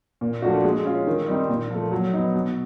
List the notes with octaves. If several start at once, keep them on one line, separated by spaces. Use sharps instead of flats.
A#2
F3 A3 D4 F#4
G#3
C#4 F4
D#3
G3 C4 D#4
A#2
F3 A3
F#3
B3 D#4
B2